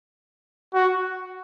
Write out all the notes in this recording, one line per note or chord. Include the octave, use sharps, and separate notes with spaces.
F#4